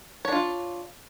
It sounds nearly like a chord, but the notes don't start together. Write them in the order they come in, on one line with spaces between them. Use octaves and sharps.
C#5 D4 F4